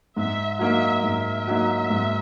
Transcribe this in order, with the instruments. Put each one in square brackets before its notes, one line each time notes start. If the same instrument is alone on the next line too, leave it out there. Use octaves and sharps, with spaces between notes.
[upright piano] G#2 [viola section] E5
[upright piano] F#3 A#3 D#4 [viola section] E5
[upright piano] G#2 [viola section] E5
[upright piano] F#3 A#3 D#4
G#2